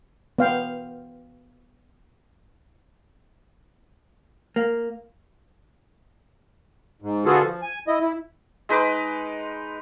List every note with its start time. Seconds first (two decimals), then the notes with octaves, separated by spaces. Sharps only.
0.39 B3 F5 G5
4.56 A#3
7.02 G#2
7.26 D3 B3 F4 F#4 G#4 A4
7.42 F3
7.62 G#5
7.88 E4 D#5
8.01 E4
8.69 G#3 D#4 B4 D6